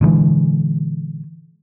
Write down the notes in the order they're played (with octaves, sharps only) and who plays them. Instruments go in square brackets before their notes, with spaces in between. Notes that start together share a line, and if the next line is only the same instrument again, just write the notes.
[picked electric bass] A#2 D3 E3 G#3